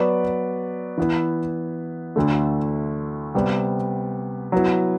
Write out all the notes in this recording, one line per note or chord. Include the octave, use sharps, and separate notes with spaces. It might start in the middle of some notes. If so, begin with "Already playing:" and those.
Already playing: F#3 B3 F#4 B4 D5
E3 B3 E4
D2 D3 A3
C3 G3 B3
F#3 B3 E4